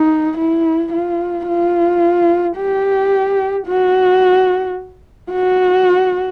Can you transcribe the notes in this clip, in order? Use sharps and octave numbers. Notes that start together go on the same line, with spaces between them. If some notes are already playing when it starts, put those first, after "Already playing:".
Already playing: D#4
E4
F4
F4
G4
F#4
F#4